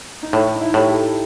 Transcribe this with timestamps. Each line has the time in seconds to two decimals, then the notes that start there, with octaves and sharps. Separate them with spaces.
0.22 D#4
0.33 A2 E4
0.55 D#4
0.61 E4
0.74 A2 G4
0.89 A4